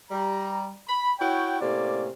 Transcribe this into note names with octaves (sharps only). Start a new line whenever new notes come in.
G3 A#5
B5
E4 F#4 C#5 G5
A2 C3 A#3 C#4 D5